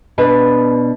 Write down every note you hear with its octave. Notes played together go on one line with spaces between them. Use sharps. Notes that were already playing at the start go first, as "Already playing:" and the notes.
B2 D4 B4